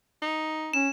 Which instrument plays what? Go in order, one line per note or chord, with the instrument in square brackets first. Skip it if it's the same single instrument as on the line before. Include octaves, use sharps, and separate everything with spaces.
[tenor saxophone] D#4
[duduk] C#4 [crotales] E7